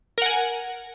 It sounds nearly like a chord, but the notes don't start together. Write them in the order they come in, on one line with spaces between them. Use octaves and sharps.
A#4 F#5 G#5